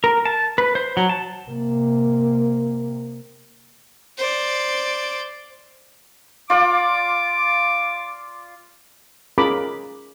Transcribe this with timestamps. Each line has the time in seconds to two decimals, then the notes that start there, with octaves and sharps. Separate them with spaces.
0.04 A#4
0.25 A5
0.58 B4
0.75 C5
0.97 F#3
1.09 A5
1.48 C3 A#3
4.18 C5 D5
6.50 F4 D5 D6
9.38 C#4 F4 G#4 A#4 B5 D6